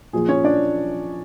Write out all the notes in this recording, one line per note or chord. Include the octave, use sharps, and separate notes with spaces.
A#2 F3 G#4
C#4 C#5
D4 D5